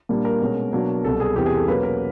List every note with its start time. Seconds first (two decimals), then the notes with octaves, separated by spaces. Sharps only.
0.09 A#2 G3 A#3 D4
0.25 A#4
0.41 B2 G#3 C#4
0.72 B2 F#3 A#3 D4
1.04 C2 B2 G3 A4
1.20 G#4
1.36 E2 C3 E3 G4
1.46 G#4
1.57 A4
1.67 B2 F#3 A#3 C#4 B4
1.83 A#4